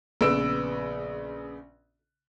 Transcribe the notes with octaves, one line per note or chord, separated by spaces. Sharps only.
A#1 C#3 B3 B4 E6 D7